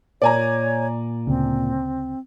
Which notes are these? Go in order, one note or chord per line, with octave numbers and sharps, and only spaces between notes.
A#2 C#5 D5 G#5 A#5
D2 C#3 C4